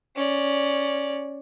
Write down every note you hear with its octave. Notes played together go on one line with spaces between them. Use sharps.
C#4 D5